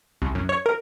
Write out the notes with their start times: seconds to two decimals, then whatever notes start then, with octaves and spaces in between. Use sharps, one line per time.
0.22 C2
0.35 F#2
0.49 C#5
0.66 A#4